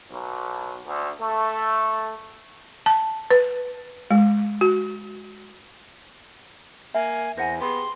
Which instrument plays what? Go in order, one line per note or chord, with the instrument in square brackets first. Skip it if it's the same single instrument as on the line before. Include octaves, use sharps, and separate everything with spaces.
[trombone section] B1
D2
A3
[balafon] A5
B4
G#3
F#4
[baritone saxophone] A#3 [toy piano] E5 [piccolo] G#5
[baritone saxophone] E2 [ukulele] C5 F#5 G#5 [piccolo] A#6
[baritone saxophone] B3 [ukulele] G4 G#4 [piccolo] C6